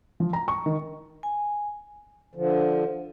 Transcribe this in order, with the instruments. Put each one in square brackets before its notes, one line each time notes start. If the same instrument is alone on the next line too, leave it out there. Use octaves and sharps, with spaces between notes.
[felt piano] F3
A#5
C#6
D#3
[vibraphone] G#5
[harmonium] D3 F3